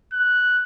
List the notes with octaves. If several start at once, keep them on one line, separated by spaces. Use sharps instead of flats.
F#6